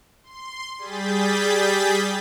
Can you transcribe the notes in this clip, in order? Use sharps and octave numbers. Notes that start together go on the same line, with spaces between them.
C6
G3 G#4 G6 A6 B6